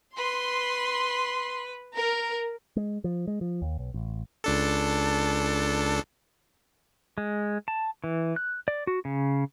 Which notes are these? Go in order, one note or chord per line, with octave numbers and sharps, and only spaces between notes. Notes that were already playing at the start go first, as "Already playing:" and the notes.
B4 C6
A#4
G#3
F3
G#3
F3
D#2
B1
A1
C#2 D4 A4
G#3
A5
E3
F#6
D5
F#4
C#3